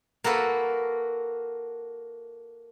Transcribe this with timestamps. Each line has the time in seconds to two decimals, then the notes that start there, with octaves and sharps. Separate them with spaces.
0.24 A#3 F#4 A4 B4